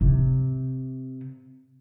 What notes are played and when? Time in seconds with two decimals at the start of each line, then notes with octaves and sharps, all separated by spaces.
0.01 C3